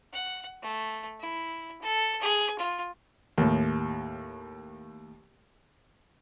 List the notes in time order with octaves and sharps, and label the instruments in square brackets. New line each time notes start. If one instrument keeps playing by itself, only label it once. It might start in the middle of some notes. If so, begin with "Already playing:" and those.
[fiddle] F#5
A3
E4
A4
G#4
F4
[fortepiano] D#2 A2